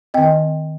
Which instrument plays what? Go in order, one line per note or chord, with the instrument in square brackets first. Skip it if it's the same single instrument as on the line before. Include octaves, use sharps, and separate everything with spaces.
[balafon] D#3 C4 D#5 G5